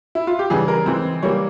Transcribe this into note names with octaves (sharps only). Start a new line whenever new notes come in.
E4
F4
G4
C#3 E3 G3 G#4
A#4
E3 G#3 C4
E3 G3 A#3 C#5